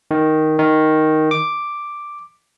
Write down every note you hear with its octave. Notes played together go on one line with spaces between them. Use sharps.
D#3
D#3
D6